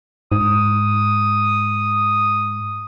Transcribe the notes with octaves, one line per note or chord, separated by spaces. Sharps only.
G#2 D#6